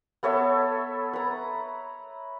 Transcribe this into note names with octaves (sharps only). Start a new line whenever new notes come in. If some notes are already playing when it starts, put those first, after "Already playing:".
B3 A4 C#5 E5
B4 A#5